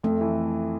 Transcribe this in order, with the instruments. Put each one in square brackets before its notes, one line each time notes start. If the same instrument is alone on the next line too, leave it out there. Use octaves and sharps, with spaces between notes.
[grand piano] F2 [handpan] A3
[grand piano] E3